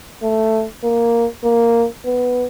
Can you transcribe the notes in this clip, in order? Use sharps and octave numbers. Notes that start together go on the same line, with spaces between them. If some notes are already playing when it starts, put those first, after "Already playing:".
A3
A#3
A#3
B3